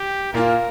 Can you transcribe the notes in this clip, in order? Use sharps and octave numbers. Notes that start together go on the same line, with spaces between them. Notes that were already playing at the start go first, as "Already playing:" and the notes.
Already playing: G4
A#2 A#3 F4 A#4